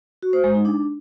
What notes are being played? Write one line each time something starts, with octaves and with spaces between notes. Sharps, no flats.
F#4
C5
G#3
D#4
D4